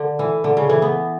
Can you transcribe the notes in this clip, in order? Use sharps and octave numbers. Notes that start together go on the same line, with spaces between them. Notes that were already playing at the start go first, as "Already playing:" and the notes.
Already playing: D3
E3
D3
C#3
E3
B3